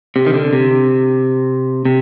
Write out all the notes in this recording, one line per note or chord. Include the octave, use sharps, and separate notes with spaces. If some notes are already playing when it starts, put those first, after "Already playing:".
C3
D#3
D3
C3
C3